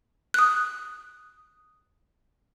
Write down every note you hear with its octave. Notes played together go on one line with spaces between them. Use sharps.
D#6 F#6